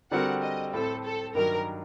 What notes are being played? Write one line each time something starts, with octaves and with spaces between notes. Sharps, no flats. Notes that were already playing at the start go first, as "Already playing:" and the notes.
D3 G3 C4 F#4 A#4 F#5
D#5
A2 A3 C4 A4
A4
G2 D#3 F#3 A#4